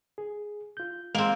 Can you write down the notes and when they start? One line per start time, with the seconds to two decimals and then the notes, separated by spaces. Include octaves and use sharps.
0.18 G#4
0.77 F4 G6
1.15 G#3 A#3 C4